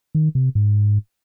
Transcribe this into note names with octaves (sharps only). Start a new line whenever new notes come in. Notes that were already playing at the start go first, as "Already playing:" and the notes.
D#3
C3
G#2